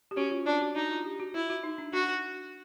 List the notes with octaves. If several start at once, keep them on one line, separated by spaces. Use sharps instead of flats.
G4
C#4 F#4
F4
D4 F4
F#4
D#4 F#4
F4
G4
F#4
E4 F4
F#4
D#4
D4
D4 F#4